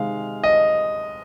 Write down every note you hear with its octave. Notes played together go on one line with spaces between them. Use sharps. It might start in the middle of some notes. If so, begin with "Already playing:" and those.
Already playing: C3 D#3 G#3 F5
D#5